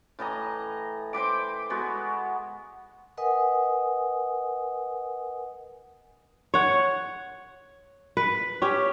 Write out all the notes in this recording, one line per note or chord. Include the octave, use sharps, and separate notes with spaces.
A2 E3 D#5 A#5
C5 G5 B5 D6
G#3 B3 F#4
A#4 B4 D#5 F#5 G#5 D#6
C#5 F#5
B4
C#4 G4